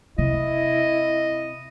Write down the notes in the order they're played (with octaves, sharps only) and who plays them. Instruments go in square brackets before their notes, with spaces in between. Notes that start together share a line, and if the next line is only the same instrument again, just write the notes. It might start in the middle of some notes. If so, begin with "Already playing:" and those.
[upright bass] C3 [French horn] E4 [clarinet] D#5